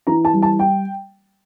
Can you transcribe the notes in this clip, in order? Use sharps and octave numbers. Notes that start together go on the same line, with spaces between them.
E3 A#5
A5
G3
A5
G5